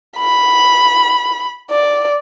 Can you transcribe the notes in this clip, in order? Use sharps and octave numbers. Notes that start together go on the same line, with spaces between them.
B5
D5